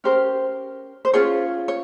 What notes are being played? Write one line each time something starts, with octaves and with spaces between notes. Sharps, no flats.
C#4 G4 A#4 C5
C5
C#4 F4 G#4 C#5
C#5